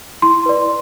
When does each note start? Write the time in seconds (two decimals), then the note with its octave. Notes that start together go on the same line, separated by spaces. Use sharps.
0.22 E4 C6
0.46 B4 D5